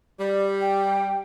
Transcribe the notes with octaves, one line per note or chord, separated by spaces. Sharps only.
G3 D5
G5